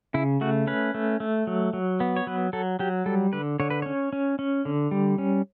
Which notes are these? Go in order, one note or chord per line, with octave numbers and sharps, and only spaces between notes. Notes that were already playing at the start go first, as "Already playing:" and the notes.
C#3 E4
A3 F#4
C#4 B4
A3
A3
F#3
F#3
B3
C#5
F#3 B4
F#3 A4
F#3 G4
G3 A4
D3 B4
D3 C#5
B4
C#4 C#5
C#4
C#4
D3
G3
C#4